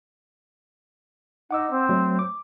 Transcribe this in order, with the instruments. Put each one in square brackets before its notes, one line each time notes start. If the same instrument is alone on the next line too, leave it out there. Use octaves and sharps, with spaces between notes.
[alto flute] D#4 [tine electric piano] F#5 D6 E6
[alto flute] C4
[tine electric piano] F#3 A3
D6